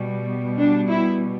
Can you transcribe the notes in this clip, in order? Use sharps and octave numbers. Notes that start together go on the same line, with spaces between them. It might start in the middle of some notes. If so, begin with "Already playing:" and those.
Already playing: B2 G3 B3
D4
E4